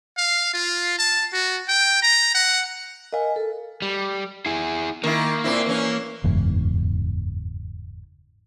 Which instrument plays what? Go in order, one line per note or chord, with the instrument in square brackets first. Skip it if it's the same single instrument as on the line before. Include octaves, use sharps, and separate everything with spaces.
[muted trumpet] F5
F4
A5
F#4
G5
A#5
F#5
[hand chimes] A#4 F5 [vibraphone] D#5 G#5
[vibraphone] A4
[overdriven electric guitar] G3
E4 G#4
[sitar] D#3 E4 [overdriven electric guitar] A#3
[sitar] A#2 C4 E4
E3 C#4
[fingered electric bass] F#1 E2 G#2